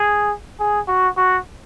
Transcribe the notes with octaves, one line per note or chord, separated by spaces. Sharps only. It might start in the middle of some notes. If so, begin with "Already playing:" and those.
Already playing: G#4
G#4
F#4
F#4